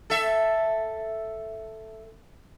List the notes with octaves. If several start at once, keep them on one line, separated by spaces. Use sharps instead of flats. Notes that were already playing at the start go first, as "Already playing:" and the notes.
A4 E5